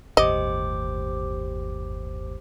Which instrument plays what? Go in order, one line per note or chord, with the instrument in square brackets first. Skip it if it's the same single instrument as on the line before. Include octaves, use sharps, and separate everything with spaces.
[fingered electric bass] G1 D#2 A2 [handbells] G4 C5 D6 [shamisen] D#5